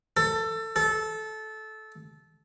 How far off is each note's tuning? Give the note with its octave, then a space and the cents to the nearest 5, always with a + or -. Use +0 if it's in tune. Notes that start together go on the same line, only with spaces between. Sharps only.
A4 +20
A4 -20